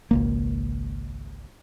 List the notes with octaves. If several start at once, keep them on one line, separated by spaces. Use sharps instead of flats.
G#1 C#2 A#3